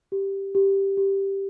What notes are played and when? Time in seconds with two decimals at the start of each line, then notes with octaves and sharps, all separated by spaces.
0.12 G4
0.55 G4
0.97 G4